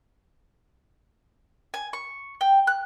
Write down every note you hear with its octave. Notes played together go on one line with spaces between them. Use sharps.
G#5
C#6
G5
F#6